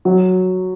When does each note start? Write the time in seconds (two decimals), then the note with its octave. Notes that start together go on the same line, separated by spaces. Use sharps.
0.05 F#3